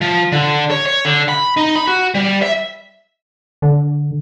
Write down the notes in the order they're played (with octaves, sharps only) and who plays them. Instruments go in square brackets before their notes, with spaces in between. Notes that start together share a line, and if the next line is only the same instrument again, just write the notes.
[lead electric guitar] F3
D3
C#5
C#5
D3
B5
D#4
B5
F#4
G3
E5
[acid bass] D3